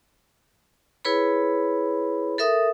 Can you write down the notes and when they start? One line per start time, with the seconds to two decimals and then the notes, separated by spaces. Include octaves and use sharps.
1.05 E4 G#4 B4 C#5 B5
2.38 A4 A#4 E5 D#6